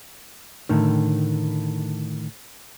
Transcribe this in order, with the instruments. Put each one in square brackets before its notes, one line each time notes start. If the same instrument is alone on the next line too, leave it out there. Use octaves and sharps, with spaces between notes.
[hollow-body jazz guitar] A2 D3 D#3